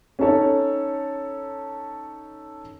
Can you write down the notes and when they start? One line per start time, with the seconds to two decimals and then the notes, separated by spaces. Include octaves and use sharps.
0.19 C#4 D#4 A4 C#5